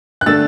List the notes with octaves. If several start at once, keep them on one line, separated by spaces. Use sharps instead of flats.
F#6
D3 A3 D4 E6 A6